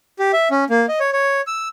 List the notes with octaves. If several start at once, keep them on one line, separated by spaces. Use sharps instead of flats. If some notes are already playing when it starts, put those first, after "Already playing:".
G4
E5
C#4
A#3
D#5
C#5
C#5
E6